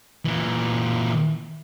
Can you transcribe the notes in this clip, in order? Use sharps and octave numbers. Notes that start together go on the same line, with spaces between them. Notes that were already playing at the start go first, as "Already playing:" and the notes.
A#2 E3